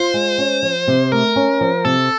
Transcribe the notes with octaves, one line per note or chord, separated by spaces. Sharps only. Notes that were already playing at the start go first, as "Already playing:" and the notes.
Already playing: F4 C5
G#3
C#4
F3
C3
A3 A#4
C#4
F3
C3 A4